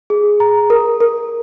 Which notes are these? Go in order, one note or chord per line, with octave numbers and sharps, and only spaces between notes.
G#4
A#5
A#4
A#4